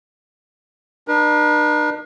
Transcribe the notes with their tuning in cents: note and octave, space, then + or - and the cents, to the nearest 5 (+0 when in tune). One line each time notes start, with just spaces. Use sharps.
D4 +45 B4 -45